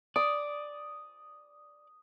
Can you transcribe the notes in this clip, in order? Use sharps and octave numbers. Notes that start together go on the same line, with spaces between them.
D5 D#6